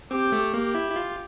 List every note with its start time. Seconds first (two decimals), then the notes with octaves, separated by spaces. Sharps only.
0.11 C4 G4
0.32 A3
0.54 A#3 G4
0.75 E4
0.91 E4
0.96 F4